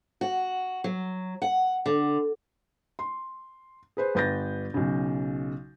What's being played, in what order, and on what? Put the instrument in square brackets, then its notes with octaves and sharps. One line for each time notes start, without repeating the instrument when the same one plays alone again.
[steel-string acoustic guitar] F#4
F#3
F#5
D3
[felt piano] C6
G#4 B4 C5
G1 B4 G6 A6 A#6
B1 C#3